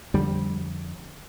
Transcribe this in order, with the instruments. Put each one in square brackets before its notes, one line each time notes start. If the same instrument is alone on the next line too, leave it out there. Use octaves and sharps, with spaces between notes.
[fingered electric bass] F2 D3 G3